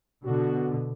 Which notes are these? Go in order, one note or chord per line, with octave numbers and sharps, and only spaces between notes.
B2 D3 F#4